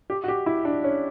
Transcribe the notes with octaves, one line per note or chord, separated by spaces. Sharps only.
G4
F#4
G4
E4
D4
C#4